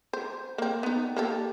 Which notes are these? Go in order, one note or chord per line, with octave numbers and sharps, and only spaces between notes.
C5
A#3 C4
B3 D#4
A#3 G4 A4